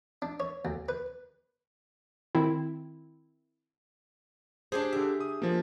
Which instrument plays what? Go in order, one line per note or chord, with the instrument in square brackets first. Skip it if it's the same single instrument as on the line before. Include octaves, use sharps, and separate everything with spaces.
[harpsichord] D4
C#5
D2
B4
[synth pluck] D#3 C4 E4
[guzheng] D4 G4 G#4 [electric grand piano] C5 G#6
[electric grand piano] D3 G4 [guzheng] E5
[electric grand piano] D#6
F3 A#3